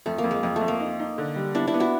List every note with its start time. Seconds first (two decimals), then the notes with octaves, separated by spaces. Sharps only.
0.06 F2 A3
0.18 A#3
0.24 F2
0.31 G#3
0.43 F2 G#3
0.56 A3
0.61 F2
0.68 A#3
0.80 D#4
0.99 D#4
1.18 D3
1.36 G3
1.55 B3 D4 E4
1.67 D4 E4
1.74 B3
1.80 E4 F#4